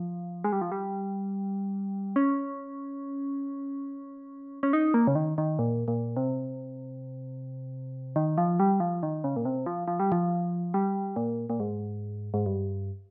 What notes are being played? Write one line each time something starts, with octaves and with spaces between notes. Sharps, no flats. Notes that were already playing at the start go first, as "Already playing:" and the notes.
Already playing: F3
G#3
G3
F3
G3
C#4
C#4
D#4
A#3
C#3
D#3
D#3
A#2
A#2
C3
D#3
F3
G3
F3
D#3
C#3
A#2
C3
F3
F3
G3
F3
G3
A#2
A#2
G#2
G#2
G2